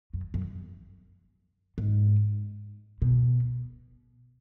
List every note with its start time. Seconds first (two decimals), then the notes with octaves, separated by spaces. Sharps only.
0.14 F#2
0.34 F#2
1.78 G#2
3.02 B2